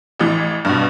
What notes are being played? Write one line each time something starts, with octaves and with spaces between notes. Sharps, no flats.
A1 E3
G2 B2